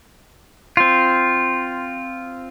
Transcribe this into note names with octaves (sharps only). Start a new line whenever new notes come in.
C4 F4